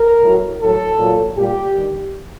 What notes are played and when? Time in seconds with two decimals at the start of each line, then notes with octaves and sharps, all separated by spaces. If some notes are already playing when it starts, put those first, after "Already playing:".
Already playing: A#4
0.23 A2 F#3
0.61 A2 F#3 A4
0.99 A#2 F#3
1.36 A#2 G3 G4
1.74 G2 D#3 G3